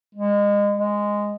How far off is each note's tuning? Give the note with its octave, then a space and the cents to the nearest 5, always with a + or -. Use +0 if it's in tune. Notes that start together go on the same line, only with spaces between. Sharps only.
G#3 -30
G#3 -10